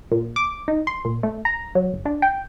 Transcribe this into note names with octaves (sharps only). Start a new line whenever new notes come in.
A#2
D6
D#4
C6
A#2
A3
A#5
F#3
G1
D4
G5